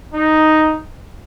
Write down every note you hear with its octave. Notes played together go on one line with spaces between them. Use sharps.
D#4